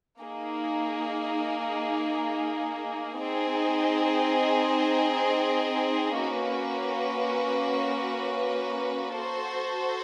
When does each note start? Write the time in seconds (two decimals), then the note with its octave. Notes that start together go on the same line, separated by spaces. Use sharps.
0.21 A#3 D#4 G#4
3.20 C4 D#4 G#4 C5 D#5
6.20 A#3 C#4 F#4 B4
9.19 F#4 A4 C5